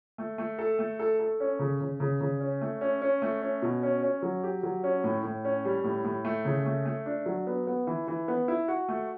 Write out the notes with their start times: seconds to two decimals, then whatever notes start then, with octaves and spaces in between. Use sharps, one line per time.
0.18 A3
0.38 A3
0.59 A4
0.79 A3
0.99 A4
1.19 A4
1.40 C#4
1.59 C#3
1.81 C#3
2.00 C#3
2.21 C#3
2.40 C#4
2.61 A3
2.81 C#4
3.02 C#4
3.22 A3
3.42 C#4
3.62 B2
3.83 C#4
4.03 C#4
4.22 F#3
4.43 G4
4.63 F#3
4.84 C#4
5.04 A2
5.24 A2
5.45 C#4
5.65 G3
5.84 A2
6.04 A2
6.25 A3
6.45 C#3
6.66 A3
6.86 A3
7.06 D4
7.26 F#3
7.47 B3
7.67 B3
7.87 E3
8.08 E3
8.28 B3
8.48 E4
8.68 F#4
8.89 A3